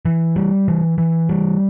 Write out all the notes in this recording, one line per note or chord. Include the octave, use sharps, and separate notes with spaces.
E3
G3
E3
E3
G3